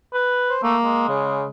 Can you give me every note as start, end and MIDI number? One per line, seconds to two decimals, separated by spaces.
0.14 0.55 71
0.49 0.60 72
0.63 0.76 57
0.63 1.08 58
0.84 1.50 56
1.09 1.46 49